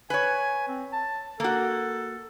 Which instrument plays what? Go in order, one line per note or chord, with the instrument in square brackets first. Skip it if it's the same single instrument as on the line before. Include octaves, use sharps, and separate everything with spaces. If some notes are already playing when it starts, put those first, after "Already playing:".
[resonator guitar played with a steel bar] B4 C#5 [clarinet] G#5
[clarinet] C4
A5
[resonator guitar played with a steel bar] A#3 F#4 [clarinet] A4